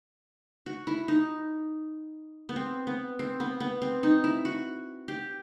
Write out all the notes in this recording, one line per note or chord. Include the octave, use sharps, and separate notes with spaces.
F#4
E4
D#4
B3
C4
B3
C4
B3
B3
C4
D#4
E4
F#4
G4